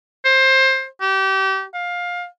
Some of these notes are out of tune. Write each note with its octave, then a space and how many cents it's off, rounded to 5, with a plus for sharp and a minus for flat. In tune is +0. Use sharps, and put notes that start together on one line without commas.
C5 +20
G4 -30
F5 +20